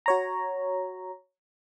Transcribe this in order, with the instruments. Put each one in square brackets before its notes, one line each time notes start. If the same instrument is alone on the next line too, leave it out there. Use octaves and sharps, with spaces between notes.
[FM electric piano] F#4 C#5 A#5